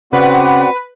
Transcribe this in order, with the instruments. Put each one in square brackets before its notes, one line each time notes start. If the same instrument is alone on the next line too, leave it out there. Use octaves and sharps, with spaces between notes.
[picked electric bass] C#3 [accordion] C4 F#4 D5 [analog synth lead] B4 [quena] F#5